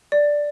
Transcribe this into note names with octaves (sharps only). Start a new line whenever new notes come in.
D5